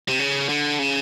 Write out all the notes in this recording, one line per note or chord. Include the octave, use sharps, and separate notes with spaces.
C3
C#3
D3
C#3